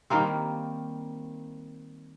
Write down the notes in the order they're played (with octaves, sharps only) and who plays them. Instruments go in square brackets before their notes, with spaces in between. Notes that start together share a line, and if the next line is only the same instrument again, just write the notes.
[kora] D#3 G3 A#3 C4